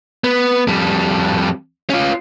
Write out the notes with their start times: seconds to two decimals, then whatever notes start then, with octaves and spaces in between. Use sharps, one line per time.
0.24 B3
0.68 F2 G3
1.90 C#4 F4